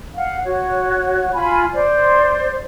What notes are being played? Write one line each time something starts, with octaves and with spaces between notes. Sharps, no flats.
F5 F#5
F#4 C#5
F4 G#5 B5
C5 D5